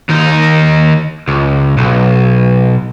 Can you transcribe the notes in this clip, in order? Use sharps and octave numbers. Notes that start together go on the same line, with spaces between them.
D#2 D#4
C#2
B1